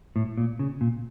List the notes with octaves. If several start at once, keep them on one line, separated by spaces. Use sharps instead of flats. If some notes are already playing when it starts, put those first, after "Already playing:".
A2
A#2
C#3
A#2